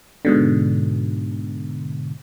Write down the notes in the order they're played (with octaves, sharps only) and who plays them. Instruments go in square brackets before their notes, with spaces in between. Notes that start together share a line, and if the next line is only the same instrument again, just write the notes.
[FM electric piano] G#2 B2 D3